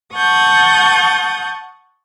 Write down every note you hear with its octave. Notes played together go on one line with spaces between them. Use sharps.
F#5 A5 C#6 D#6 G6